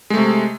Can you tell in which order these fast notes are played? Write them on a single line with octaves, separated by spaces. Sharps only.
G#3 A3 C3